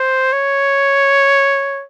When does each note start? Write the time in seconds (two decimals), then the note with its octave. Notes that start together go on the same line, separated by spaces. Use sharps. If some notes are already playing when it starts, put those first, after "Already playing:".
Already playing: C5
0.33 C#5